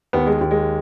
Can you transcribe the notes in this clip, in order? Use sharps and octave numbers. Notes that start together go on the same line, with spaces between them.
D#2 B3
G#3
D#2
G#3